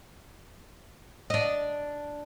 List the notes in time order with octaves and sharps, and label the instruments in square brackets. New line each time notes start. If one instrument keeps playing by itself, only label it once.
[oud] D4 D#5